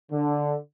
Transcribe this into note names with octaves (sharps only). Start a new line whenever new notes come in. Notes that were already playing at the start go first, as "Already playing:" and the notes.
D3